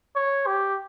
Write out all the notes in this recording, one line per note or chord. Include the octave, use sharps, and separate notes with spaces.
C#5
G4